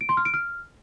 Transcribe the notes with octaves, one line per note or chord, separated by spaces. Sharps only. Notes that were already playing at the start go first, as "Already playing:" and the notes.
D7
C6
F6
D7
F6